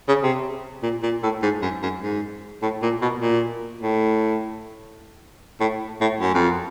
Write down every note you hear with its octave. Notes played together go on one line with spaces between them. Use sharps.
C#3
C3
A#2
A#2
A2
G#2
F#2
F#2
G#2
A2
A#2
B2
A#2
A2
A2
A2
F#2
F2